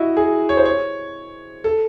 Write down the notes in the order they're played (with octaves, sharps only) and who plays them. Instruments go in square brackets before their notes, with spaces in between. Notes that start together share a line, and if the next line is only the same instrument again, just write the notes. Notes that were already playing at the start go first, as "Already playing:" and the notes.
Already playing: [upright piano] E4 F#4 D#5
G#4
C#5
C5
C#5
A4